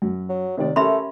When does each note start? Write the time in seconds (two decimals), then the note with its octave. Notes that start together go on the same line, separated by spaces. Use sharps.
0.02 F#2
0.29 F#3
0.57 D#2 C3 D#3 D5
0.76 A3 C#4 G4 A#4 E5 B5 C6